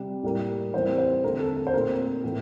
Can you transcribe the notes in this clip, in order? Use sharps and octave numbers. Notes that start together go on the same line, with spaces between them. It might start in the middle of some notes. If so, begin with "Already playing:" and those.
Already playing: C3 G3
A2 G3 A#3
E3 G3 C4 C5
C5
D3 A3 C4 A#4
A4
A4
C5
A#2 A3 C4 A#4
A2 E3 A#3